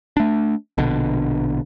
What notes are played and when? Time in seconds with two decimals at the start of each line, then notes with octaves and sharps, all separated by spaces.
0.17 A3 D4
0.78 A#1 B2 D3